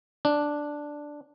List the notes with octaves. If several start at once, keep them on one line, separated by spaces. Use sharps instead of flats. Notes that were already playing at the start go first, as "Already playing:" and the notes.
D4